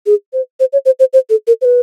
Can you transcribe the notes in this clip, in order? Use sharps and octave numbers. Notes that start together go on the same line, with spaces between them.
G#4
C5
C5
C#5
C5
C5
C5
A4
A#4
C5
B4